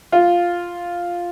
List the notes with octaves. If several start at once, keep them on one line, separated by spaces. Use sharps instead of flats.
F4